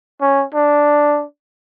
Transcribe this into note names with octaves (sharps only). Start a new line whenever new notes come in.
C#4
D4